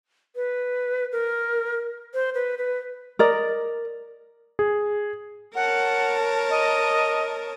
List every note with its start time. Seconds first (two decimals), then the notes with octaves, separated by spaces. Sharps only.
0.36 B4
1.12 A#4
2.14 C5
2.35 B4
2.58 B4
3.19 A#4 D5 D#5
4.59 G#4
5.55 A#4 C#5 F#5 A5
6.50 D#5